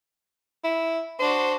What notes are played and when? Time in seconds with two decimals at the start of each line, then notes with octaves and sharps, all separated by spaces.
0.64 E4
1.19 D4 F#4 C5